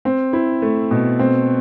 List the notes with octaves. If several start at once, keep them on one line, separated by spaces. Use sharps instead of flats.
C4
E4
A3
B2
C4